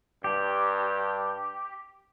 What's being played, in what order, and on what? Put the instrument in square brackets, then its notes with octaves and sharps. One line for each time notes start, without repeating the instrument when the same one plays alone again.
[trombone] G2 [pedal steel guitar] G4